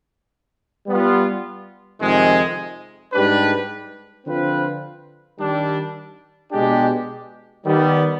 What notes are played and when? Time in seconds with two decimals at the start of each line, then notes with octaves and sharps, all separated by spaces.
0.87 G3 B3 F4
2.00 F2 C3 D#3 G#3
3.13 G#2 G3 D4 G4 B4
4.26 D3 F3 C4 F4 B4
5.39 D#3 G3 D4
6.52 B2 G#3 D4 G4
7.65 D#3 G3 B3